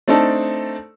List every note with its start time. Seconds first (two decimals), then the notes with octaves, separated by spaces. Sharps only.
0.08 A3 C4 D4 D#4 A4